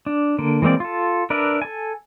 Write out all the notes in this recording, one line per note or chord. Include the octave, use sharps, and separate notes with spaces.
D4
D3 A#3
E3 G#3 A#3 C4 D5
F4 A4
D4 A#4 B4 D5 E5
A4 G#5